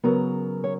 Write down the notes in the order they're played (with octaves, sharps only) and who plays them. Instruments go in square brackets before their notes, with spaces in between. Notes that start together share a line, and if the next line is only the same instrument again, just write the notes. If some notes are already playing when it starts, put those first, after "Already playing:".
[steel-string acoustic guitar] C#3 F#3 B3 A#4
C#5